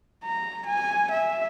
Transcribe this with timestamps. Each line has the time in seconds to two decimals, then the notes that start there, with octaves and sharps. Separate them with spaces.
0.25 A#5
0.66 G#5
1.11 E5